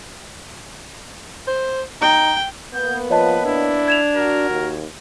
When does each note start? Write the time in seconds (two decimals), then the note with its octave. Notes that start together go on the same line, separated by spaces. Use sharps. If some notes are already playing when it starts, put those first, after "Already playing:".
1.47 C5
2.01 D#4 G5
2.74 A#3 B3 G6
3.10 F3 B4 C#5 D#5 A5
3.45 D4 E4
3.88 G#6 E7 F7
4.16 F#4 A#4
4.50 D#2